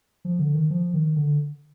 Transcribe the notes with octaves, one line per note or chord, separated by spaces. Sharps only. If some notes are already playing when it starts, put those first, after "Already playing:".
F3
D3
D#3
F3
D#3
D3